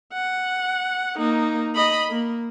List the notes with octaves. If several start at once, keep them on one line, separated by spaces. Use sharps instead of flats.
F#5
A#3 D#4
D#5 B5
A#3